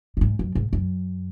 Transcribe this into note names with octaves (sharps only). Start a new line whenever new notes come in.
A#2
G#2
F#2
G#2
F#2